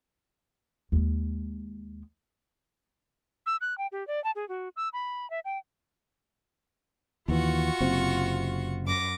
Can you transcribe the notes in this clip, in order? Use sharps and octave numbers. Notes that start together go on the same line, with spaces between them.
D#2 G#3
E6
F#6
G5
G4
D5
A5
G#4
F#4
E6
B5
E5
G5
D#2 E3 F4 F#4 C#6
F#1 C3 C4
F#2 D6 A#6